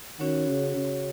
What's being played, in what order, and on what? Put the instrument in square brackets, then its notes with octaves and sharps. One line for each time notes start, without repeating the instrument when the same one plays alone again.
[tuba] D#3 [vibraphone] C#4 F#4 C#5 F#5
[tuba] C#3
C#3